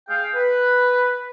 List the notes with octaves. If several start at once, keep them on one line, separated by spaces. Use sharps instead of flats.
G#4 F5 G5
B4